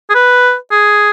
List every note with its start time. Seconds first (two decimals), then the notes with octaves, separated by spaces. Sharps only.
0.10 G#4
0.15 B4
0.71 G#4